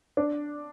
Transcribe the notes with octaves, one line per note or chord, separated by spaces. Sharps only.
D4